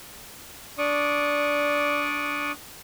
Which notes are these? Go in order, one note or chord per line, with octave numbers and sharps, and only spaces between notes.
D4 D5 C#6 D#6